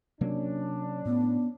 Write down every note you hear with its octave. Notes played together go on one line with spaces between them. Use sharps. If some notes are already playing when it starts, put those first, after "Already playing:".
C3 F#3 A#3 C#4 D4
A2 B3